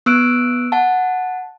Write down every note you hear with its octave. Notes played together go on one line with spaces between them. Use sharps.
B3 E6 F#6 D7
F#5 A5